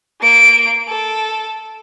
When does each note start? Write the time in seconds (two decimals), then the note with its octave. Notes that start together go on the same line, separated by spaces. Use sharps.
0.22 A#3 D7
0.89 A4